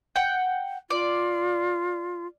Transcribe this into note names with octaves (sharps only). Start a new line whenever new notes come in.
F#5 G5
F4 D5